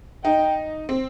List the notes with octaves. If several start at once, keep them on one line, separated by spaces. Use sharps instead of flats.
D#4 G5
C4